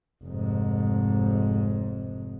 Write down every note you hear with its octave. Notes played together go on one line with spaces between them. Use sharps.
F1 G#2